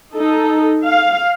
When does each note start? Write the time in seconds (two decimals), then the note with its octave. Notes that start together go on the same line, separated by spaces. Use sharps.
0.14 D#4 A4
0.85 F5